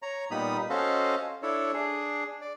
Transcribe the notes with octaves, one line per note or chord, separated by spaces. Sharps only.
C#5 A#5
A#2 G3 B3 D#4 B5 D#6
C#4 F#4 A4 C5 D#5 F5
D4 E4 A4 C#5
D4 G#4
D5